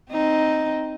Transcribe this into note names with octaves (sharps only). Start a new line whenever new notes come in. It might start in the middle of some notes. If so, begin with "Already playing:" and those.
C4 D#4